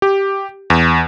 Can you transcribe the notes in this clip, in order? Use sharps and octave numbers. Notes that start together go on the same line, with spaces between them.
G4
E2